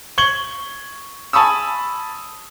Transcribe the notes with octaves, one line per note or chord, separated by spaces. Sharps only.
C#6 G#6 F#7 G7
G#5 A5 B5 C#6 D#6 E6